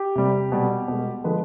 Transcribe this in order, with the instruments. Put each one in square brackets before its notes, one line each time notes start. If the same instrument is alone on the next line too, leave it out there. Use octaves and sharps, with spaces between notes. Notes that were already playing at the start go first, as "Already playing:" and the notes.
Already playing: [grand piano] G4
C3 G3
B2 G3
B2 G#3
D3 F3 G#3 B4